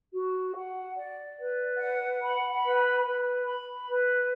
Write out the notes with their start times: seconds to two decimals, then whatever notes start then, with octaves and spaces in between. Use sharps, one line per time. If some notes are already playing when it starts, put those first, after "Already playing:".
0.13 F#4
0.55 F#5
0.96 D5
1.37 B4
1.79 F#5
2.21 B5
2.63 B4
3.04 B4
3.45 B5
3.87 B4